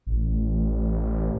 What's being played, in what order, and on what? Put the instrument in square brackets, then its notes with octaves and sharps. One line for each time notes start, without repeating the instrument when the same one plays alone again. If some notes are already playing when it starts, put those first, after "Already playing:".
[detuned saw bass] A1